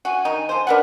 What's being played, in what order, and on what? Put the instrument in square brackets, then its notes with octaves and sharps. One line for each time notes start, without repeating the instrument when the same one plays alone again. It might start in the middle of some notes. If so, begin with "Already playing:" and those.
[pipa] F#4 [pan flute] G#5
[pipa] D#3 D#4
F3 C5
[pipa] D4 B4 F#5 [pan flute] A#4